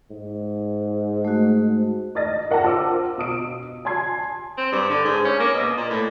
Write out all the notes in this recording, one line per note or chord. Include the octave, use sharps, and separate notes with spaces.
G#2
A3 F#4
D5 D#5 A6 A#6
A#4 F#5 G5 A5 A#6
F4 C5 D6 E6
B2 D#6 D7
G#5 A5 C6 G#6 C7
C4
G2
D3
G#2
C#4
A#3
B2
A#2
A2